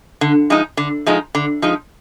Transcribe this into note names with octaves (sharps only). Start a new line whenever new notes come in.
D3
F3 G#3 D#4
D3
F3 G#3 D#4
D3
F3 G#3 D#4